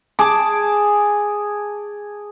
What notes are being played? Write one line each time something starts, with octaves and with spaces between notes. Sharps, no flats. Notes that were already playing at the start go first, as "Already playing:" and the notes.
G#4 A5 D6